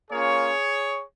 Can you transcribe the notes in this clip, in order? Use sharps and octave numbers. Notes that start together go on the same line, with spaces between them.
A#3 C#4 F4 G#4 C#5